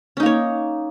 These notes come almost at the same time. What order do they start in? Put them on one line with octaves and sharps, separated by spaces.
C#4 D#4 A#3 C#5